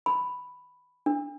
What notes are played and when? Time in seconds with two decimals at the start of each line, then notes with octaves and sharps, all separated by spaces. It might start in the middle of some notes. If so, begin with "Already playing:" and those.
0.06 B5
1.06 D4